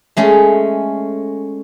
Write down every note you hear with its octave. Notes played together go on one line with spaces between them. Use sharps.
G#3 A3 C#4